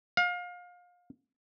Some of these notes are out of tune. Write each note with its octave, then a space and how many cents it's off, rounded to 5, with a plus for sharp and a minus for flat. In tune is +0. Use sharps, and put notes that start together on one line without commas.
F5 +30